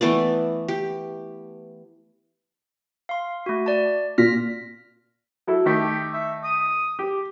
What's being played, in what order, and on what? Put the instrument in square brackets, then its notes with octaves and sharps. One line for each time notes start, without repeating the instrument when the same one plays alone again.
[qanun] E3 A3 B3 D5
G4
[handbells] F5 C6
A3 F#4
D5 A5
[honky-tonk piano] A#2 [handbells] F6 A#6 B6
[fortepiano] F#3 E4 A4
[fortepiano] D#3 A3 [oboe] G4
[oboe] E5
D#6
[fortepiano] G4